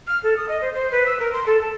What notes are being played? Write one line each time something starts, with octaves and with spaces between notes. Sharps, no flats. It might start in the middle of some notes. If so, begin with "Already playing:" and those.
F6
A4
D#6
D#5
C5
C5
B4
E6
A#4
C6
A4
A5